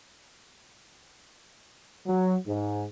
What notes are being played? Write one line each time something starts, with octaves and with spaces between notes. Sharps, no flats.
F#3
G#2